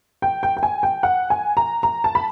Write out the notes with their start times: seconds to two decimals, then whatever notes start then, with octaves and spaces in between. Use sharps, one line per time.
0.22 G5
0.43 G5
0.57 G5
0.63 G#5
0.83 G5
1.03 F#5
1.30 G#5
1.57 A#5
1.83 A#5
2.04 A5
2.15 B5